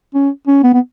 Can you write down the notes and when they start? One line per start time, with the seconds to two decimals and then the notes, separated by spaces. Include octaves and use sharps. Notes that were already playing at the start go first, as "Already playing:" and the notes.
0.14 C#4
0.47 C#4
0.63 B3
0.74 B3